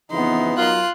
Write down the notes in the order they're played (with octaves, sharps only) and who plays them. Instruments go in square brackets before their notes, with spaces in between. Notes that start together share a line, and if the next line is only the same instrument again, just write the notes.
[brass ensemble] F2 C#3 E3 [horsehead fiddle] B3 D#4 [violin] C6
[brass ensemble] F#3 A#4 [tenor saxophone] F4 [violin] C6 F#6